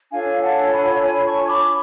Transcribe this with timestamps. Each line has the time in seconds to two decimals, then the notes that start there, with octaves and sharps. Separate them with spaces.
0.11 D4 F4 A4 C#5 F5 G#5
0.41 F#5 A5
0.72 G#5 B5
1.02 G#5 B5
1.25 A5 C#6
1.42 C#6
1.48 B5 D6